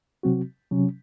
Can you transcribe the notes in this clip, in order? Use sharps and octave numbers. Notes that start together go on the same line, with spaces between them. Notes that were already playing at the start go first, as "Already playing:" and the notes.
C3 F#3 C4 F#4
C3 F#3 C#4